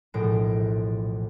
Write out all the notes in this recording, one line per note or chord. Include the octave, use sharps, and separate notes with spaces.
E1 A#1 A2 G#3 A#6 D7